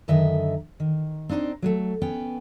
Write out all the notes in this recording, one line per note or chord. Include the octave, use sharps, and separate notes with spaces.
F#2 D3 D#3 D#5 E5
D#3
C4 D4 D#4 B4 C5
F#3 G#3 A3
B3 C#4 G5